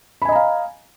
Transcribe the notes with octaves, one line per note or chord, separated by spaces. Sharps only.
D#5 F5 G#5 A#5 B5